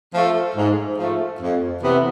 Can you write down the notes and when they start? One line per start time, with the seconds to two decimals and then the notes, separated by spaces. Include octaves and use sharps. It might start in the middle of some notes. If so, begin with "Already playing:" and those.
0.13 F3 A3
0.55 G#2
0.98 F3 A3
1.41 F2
1.83 C3 E3 B3